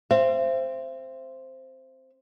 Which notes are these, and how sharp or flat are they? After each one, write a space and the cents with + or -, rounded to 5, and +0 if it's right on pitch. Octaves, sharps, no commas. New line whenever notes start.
C4 +0 E5 +40